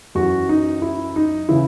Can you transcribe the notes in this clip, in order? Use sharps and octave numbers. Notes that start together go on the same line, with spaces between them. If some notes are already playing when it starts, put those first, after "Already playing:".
F#2 E3 F#4
D#4
E4
D#4
C#3 E3 E4